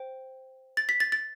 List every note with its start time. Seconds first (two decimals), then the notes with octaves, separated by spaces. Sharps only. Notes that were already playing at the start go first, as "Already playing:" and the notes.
Already playing: C5 G5
0.77 A6
0.89 B6
1.00 A6
1.12 A6